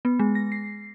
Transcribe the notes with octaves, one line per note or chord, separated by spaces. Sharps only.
B3
G#3
A#6
C7